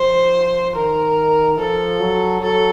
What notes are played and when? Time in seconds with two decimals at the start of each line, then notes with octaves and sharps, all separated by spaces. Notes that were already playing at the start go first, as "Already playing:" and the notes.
Already playing: F3 C5
0.75 D#3 A#4
1.58 F3 A4
2.00 F#3
2.41 F#3 A4